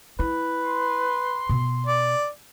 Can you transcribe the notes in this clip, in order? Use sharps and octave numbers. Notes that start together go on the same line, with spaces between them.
E4 B4
C6
B2
D5